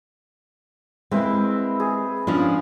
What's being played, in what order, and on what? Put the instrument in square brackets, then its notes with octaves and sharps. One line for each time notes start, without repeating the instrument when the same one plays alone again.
[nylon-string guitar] G#3 A#3 [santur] C4 E4 B4
[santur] G#4
[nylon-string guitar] F3 C#4 D4 [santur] F4